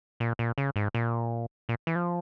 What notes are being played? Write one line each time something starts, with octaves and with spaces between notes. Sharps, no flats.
A#2
A#2
C#3
G#2
A#2
A#2
E3
F3